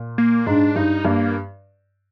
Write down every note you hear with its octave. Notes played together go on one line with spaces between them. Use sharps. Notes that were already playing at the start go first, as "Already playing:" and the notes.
Already playing: A#2
A#3
G#2 D4
G2 D#4
G2 A#3